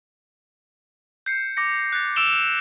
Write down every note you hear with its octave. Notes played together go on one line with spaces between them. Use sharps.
G6 C7 C#7
D6 A#6 C#7
F#6 A6 C7
D6 E6 D7 E7 F7 G7